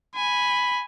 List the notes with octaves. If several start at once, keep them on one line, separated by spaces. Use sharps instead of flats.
G#5 B5